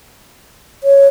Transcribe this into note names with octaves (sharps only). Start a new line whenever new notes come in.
C#5